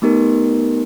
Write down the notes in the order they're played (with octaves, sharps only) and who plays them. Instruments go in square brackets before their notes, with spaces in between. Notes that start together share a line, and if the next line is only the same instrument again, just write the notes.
[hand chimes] A3 B3 D#4 G4 A#4